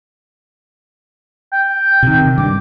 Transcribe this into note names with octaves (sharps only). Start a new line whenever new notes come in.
G5
C3 D#3
G2 D6